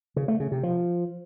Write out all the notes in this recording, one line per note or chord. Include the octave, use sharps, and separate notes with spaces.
C#3
A3
C#3
C3
F3